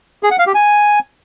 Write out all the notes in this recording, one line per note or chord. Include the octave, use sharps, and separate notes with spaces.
G#4
F#5
F5
G4
G#5